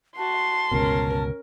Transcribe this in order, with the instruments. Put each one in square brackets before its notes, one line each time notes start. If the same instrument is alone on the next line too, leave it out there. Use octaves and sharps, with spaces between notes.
[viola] F#4 [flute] A5 [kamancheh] C6
[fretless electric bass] G1 C#2 B2 [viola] C#4 A#4